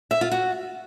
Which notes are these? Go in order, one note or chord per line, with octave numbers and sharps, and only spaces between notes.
E5
F4
F#4